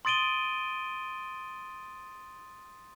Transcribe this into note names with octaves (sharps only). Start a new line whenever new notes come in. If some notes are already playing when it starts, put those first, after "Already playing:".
C6 D#6 A6 D7 D#7 G7